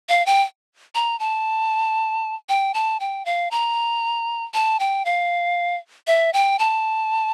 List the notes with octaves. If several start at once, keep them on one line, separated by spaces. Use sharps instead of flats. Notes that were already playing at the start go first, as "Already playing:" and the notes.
F5
G5
A#5
A5
G5
A5
G5
F5
A#5
A5
G5
F5
E5
G5
A5